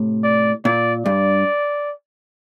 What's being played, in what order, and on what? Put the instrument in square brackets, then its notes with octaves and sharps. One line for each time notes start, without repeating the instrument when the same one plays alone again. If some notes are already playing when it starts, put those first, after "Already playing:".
Already playing: [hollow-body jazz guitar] A2 C3
[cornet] D5
[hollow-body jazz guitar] A#2 [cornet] D5
[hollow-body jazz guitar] G2 [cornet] D5